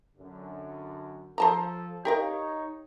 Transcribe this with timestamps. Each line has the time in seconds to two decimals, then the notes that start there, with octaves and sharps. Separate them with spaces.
0.17 F#2 D3
1.38 F3 A4 C5 A5 A#5
2.05 D#4 G4 A#4 C#5 F5